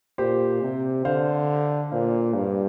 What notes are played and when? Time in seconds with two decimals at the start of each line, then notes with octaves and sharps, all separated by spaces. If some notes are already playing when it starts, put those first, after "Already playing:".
0.18 A#2 G4 C5
0.62 C3
1.05 D3 C5 F5
1.92 A#2 C5 F5
2.34 G2